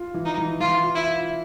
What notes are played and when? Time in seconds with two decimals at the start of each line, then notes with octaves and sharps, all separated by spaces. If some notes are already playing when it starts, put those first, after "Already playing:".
Already playing: F4
0.14 E3
0.25 D#4
0.38 E3
0.60 E3 F4
0.83 F4
0.95 E4
1.07 F4